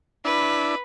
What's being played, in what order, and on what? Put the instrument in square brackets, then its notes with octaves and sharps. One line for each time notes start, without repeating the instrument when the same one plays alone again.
[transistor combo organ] D4 E4 [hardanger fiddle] B4